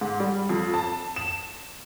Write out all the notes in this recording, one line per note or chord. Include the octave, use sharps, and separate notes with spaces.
G#2
G3
F2
A5
E7